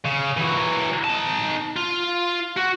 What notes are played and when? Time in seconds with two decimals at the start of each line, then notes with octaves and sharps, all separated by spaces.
0.05 C#3
0.37 E3 F#3
1.04 D#4 A5
1.76 F4
2.57 F#4